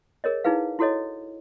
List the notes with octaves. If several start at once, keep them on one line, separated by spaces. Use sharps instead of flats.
G#4 A#4 C#5 D#5
D#4 E4 G#4 B4 F5
E4 F#4 A4 C#5 D#5